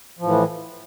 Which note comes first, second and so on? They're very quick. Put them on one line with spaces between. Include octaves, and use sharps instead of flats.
F3 A2 E3